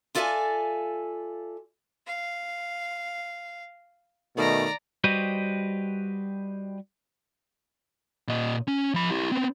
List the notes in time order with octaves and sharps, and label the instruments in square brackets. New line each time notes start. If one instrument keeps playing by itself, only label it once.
[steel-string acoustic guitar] E4 F4 A4 D5 E5 G#5
[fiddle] F5
[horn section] B2 D#3 A3 [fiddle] D5 A#5
[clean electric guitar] G3 F#4 G4 B4 C5 D#5
[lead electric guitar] A#2 D#5
C#4
F3 B5
E4 G4
B3 C4